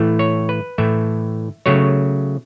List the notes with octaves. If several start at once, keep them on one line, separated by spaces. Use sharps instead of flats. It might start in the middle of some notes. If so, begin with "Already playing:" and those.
Already playing: A2 E3 A3
C#5
B4
A2 E3 A3 E5
C#3 F#3 A3 C#5